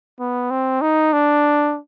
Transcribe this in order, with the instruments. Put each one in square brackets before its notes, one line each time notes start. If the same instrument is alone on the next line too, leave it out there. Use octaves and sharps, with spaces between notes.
[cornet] B3
C4
D#4
D4